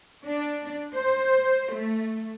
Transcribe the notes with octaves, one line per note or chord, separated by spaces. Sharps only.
D4
C5
A3